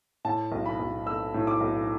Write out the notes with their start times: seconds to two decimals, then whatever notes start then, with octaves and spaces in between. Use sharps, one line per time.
0.25 A2 A5
0.52 B1
0.66 B5
0.79 B1
1.06 A3 E6
1.34 A2
1.47 D6
1.61 B1